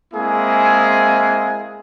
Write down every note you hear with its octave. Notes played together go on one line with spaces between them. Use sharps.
G#3 A#3 C4 E4 G#4